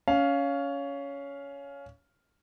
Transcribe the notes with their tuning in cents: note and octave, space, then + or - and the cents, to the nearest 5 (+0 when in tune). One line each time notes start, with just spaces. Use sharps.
C#4 +15 F5 +0